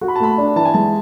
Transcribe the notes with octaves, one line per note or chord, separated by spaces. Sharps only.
F#4
B5
A5
A3 B5
D4
E3 A5
G#5
G#3 A5